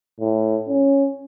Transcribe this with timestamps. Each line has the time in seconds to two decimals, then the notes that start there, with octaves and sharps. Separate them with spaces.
0.20 A2
0.68 C#4